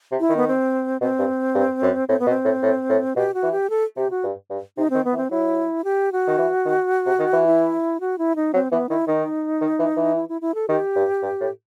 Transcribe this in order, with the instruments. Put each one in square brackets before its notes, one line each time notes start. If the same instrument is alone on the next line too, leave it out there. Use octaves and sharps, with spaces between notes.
[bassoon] C3
[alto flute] E4
[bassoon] D#3
[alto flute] B3
C4
[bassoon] B2 [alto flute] C4
[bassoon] G2
G2
F#2
[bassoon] A2 [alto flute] C4
[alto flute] B3
[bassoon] B2
[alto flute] C4
[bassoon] A2
A2
A2
[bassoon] B2 [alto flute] G4
[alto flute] F#4
[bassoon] E3
[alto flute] G4
A4
[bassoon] C3 [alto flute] G4
[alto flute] F#4
[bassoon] G2
G2
[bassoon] C3 [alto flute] D#4
[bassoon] D#3 [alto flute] C4
[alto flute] B3
[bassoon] E3
[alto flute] C4
[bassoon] F#3 [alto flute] E4
[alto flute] G4
F#4
[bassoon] D#3
E3
D#3
C3
D#3
E3
[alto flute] E4
F#4
E4
D#4
[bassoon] F#3 [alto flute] C4
[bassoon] E3 [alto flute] B3
[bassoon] D#3 [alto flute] E4
[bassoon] D#3 [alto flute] D#4
[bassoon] D#3
E3
E3
[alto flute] E4
E4
E4
A4
[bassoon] D#3 [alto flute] G4
[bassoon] G2
G2
A2